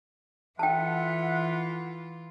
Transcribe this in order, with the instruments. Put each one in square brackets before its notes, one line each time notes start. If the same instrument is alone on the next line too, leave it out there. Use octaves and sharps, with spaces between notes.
[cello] E3 F4 [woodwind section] A4 E5 F#5 [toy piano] G5 A5